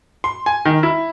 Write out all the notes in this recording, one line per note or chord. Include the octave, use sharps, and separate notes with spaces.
C6
G#5
D#3
E4